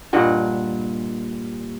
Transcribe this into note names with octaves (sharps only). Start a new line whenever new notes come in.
G2 A#2 D#5 F#5